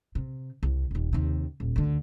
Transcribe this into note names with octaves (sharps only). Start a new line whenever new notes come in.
C3
C2
D#1 D#2
D#2 C3
D#1
D2 D3